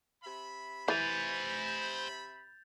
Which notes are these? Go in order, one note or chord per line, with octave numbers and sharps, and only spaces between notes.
C3 E5 B5
E3 C5 G#5 G6 A6 F7